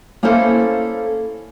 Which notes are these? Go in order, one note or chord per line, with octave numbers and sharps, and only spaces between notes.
A#3 C#4 E4 A4 C5 F5